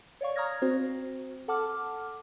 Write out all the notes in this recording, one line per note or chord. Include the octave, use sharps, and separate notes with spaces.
C#5 D5 F5 C#6
A#5 C#6 D#6 F6 G#6 A#6
C4 F#4 C5
A4 F#5 A5 D6 F6